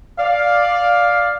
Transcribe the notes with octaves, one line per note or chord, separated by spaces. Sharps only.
D5 F5